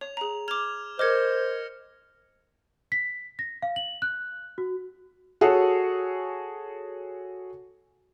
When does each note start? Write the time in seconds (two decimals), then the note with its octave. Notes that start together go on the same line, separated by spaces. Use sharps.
0.01 C#5 F7
0.17 G#4 A#5
0.48 D6 F6 G#6 E7 F7
0.99 A#4 C5 D#5 D6 F6 G#6 A#6 C#7
2.92 B6
3.39 A#6
3.62 F5
3.76 F#7
4.02 F#6
4.58 F#4
5.41 F#4 G#4 A4 C#5